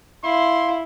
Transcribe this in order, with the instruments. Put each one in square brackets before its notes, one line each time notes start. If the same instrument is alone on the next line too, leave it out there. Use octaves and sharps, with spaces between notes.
[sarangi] E4 [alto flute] F5 [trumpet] C6